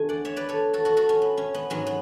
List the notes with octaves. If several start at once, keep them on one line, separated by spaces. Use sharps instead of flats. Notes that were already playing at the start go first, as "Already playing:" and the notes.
Already playing: E2 D3 A3 G#5
D5 F#5
C#5 E5
B4 D5
A4 C#5
F#4 A4
F#4 A4
F#4 A4
C#4
B3
C#4
B3
G#2 F#3 B3 C#4
B3